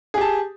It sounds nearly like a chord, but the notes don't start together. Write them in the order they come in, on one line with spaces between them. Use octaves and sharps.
G#4 G4 A5